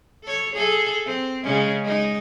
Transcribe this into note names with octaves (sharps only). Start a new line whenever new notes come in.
A4 C#5
G#4 A4
C4
C#3 G#3 C#4
G#3 D#4